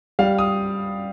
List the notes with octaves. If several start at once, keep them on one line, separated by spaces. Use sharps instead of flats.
G3 F5
D#6